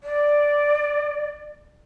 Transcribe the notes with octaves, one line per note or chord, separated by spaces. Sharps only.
D5